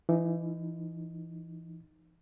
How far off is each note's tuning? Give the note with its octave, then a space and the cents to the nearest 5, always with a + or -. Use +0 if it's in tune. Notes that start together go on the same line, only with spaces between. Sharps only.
E3 +25 D#4 +0